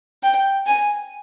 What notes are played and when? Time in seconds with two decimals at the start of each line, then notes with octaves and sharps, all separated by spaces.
0.23 G5
0.67 G#5